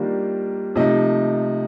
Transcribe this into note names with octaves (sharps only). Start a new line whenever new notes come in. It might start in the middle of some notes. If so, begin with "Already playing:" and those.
Already playing: D#3 G3 A#3 D4 F4
C3 F3 A3 D#4 D#5